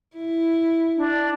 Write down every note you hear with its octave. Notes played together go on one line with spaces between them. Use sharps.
E4
D4